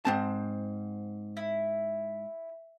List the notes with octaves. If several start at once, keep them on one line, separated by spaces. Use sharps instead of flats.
G#2 C4 A5
E4